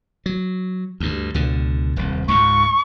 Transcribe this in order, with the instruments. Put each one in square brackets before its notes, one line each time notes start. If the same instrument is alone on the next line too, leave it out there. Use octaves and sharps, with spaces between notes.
[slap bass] F#3
D2 G2
C#2 B2 D3
D#1 C2
[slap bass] C#2 G#2 [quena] C#6